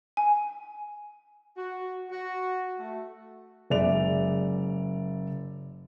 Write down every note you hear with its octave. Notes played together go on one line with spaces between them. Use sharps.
G#5
F#4
F#4
A3
F#1 G#3 D5 E5 F7